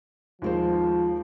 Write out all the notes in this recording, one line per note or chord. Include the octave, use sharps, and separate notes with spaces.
D#2 F3 G#3 C5